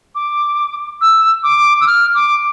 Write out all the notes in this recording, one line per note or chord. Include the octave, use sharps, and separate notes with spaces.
D6
E6
D6
E6
F6
D6